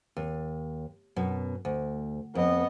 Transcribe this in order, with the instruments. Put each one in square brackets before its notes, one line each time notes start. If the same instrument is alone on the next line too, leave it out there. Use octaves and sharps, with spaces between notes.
[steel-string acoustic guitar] D#2
F#2 B2
D2
[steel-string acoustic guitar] F2 [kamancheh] B3 D#5